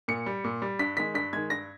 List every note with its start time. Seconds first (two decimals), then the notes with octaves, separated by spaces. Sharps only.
0.08 A#2 C#7
0.26 G3
0.44 A#2
0.62 G3
0.79 G2 B6
0.97 D#3 G#3 B6
1.14 G2 B6
1.33 D#3 G#3 G#6
1.50 G2 A#6